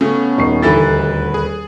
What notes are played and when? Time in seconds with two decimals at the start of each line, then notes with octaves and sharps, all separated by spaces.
0.01 C#3 A3 B3 C#4
0.38 D#1 D#4 C#6 C7
0.62 D#1 D2 D3 E3 E4 G4 B4 A6
1.34 G#4